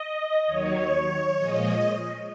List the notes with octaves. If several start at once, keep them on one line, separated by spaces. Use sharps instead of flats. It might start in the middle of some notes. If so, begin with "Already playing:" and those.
Already playing: D#5
D#2 D#3 F#3 C#5
A#2 F3 G#3 D#5